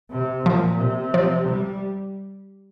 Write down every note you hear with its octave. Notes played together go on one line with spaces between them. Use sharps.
C3
A#2 F3
C3
F3
G3